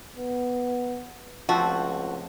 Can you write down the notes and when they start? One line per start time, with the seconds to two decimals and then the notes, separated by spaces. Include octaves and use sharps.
0.16 B3
1.49 C#2 F3 A3 C4 F#4